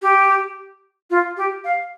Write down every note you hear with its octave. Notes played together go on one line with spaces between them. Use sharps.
G4
F4
G4
F5